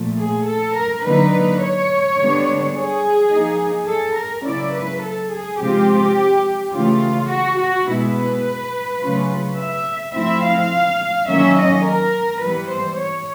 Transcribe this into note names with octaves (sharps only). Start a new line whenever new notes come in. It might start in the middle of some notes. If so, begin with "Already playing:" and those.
Already playing: A#2 F3 A3
G#4
A4
A#4
D3 F#3 A#3 D#4 B4
C#5
D3 G3 B3 D4
G#4
F3 A#3 D#4
A4
A#4
C#3 F#3 A#3 C#4 E4 D5
B4
A4
G#4
C3 F3 G#3 C4 F4 G4
C#3 E3 A3 F4
F#4
F#4
B2 G#3 B3 E4 B4
C#3 F#3 A3 C#4 F4
E5
F3 A3 C4 E4 E5
F5
D#3 F#3 A#3 C#4 E5
D#5
A#4
E3 G3 B3 B4
C5
C#5